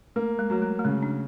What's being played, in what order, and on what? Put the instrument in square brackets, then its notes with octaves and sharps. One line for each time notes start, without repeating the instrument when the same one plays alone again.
[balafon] A3 [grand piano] A#3
[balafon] G#3
[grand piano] F#3 [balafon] A3
[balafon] G#3
A3
[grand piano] C#3 [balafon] G#3
[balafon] D4